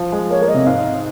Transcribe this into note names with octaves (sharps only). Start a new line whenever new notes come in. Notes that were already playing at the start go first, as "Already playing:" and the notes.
Already playing: F3
G#3
A#3 C#5
A#3
D#5
C3
G#2 F5